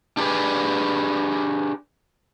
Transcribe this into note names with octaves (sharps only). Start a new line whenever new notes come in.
D4 G4 G#4 B4 D5